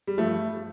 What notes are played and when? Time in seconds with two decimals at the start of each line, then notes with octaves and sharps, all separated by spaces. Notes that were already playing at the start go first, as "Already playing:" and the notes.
0.07 G3
0.18 G2 F3 A3